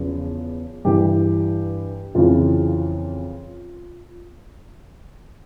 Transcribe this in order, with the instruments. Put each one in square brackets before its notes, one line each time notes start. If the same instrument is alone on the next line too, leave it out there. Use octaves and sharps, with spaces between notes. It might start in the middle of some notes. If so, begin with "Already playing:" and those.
Already playing: [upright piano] E2 C#3 F3
G2 E3 G4
F2 C#3 E3 F4